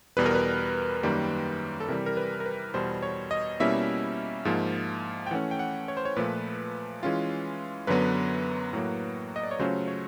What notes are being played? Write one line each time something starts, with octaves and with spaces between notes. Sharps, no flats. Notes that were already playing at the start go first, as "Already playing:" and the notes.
E2 B2 G3 B4
A#4
B4
F#2 D#3 G3 A#3
A4
C3 E3 G3 A#4
A#4
B4
A#4
B4
E2 B2 G3 C5
C#5
D#5
B2 G3 A#3 C#4 E4 E5
G#2 F3 A#3
G5
E3 A3 C#4 F#5
G5
F#5
C#5
C5
C#5
A#2 F3 A3 B4
E3 G#3 C#4 F4
F#2 D3 F#3 B3 B4
A2 F#3 A#3
D#5
D5
C#5
C#3 F#3 A3 C#4 F4 C5
C#5